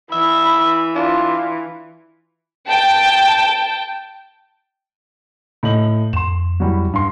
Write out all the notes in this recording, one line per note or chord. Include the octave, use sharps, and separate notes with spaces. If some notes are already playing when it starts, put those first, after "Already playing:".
E3 E5 B5
D4 F4
G5 A5
A2 D#5 F#7
F2 C6 E7
F#3 G3 E4
G2 C6